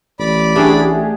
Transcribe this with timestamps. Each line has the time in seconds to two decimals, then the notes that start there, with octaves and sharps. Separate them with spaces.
0.19 A1 D5 B5 D6
0.56 A3 D4 G4 G#4 F#5